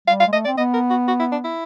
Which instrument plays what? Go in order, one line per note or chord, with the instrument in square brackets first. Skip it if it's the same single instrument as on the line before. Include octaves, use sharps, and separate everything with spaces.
[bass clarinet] G3 [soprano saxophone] F5
[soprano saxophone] F5
[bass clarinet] G#3
[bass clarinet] A3 [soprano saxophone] D#5
[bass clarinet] C4 [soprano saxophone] D5
[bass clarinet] B3 [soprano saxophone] D#5
[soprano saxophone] A#4
F#4
F#4
E4
D4
E4